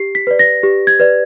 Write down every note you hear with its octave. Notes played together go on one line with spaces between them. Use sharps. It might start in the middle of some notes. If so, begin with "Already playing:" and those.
Already playing: G4 C7
B6
B4 D5
A#6
G4
G#6
B4 D5